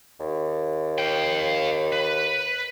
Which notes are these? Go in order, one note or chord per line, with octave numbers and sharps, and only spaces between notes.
D#2
F5 G5
B4